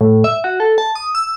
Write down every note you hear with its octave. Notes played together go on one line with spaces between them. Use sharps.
A2
E5
F#4
A4
A5
D#6
E6